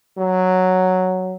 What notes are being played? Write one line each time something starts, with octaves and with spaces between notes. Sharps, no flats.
F#3